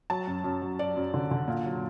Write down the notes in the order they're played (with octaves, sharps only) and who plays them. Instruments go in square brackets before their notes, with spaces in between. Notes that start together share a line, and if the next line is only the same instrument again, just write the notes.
[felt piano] F#3 A5
F#2
F#2
F#3
F#3 D5
F#2
D3
D3
A#2
F#3